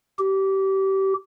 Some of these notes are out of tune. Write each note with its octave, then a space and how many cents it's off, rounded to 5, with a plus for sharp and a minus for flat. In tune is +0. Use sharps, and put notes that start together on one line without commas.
G4 -25